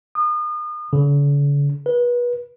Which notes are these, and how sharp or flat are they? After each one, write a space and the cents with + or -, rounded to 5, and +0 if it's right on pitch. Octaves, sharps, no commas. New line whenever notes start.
D#6 -35
D3 -45
B4 -30